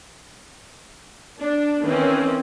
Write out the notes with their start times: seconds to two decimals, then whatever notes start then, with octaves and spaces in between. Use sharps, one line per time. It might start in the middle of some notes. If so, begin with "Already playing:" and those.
1.39 D4
1.81 D#3 E3 C4 C#4